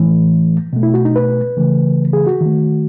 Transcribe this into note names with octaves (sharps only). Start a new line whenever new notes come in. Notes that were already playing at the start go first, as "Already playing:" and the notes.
Already playing: A2 E3 A3
B2 A3
E4
F#4
D#4
B4
C#3 E3 A3
G#4
F#4
D#3 A3